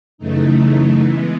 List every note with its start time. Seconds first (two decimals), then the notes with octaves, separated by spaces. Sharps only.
0.18 F#2 C#3 E3 A3 D#4
1.01 E3 G#3 B3